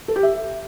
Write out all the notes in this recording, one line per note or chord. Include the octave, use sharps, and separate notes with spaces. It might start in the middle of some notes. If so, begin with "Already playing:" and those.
A4
G4
E5